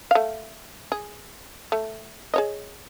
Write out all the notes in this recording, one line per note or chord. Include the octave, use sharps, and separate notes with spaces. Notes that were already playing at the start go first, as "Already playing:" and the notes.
A3 F5
G#4
A3
G#4 C#5 D#5